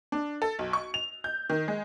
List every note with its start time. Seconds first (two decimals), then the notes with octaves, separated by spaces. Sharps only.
0.12 D4
0.42 A4
0.59 B1
0.73 C#6
0.94 F7
1.24 G6
1.50 D#3
1.68 G#3